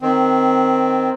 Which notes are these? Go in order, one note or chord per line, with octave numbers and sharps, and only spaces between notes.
D#3 C4